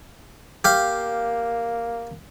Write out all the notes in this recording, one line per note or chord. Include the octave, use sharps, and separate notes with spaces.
A#3 G4 F5